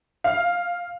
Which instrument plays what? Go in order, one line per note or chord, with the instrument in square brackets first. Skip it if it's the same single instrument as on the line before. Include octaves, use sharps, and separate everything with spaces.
[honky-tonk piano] F5